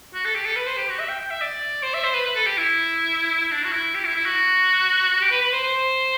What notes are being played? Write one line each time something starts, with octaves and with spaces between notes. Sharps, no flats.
F#4
A4
G4
A4
B4
C5
G4
F#4
E5
G5
G5
E5
D5
C5
E5
C5
B4
B4
A4
G4
E4
E4
D4
F#4
E4
G4
E4
E4
F#4
G4
B4
B4
C5
C5